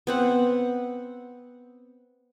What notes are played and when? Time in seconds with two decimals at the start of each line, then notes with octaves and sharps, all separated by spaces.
0.07 B3 C4 F#5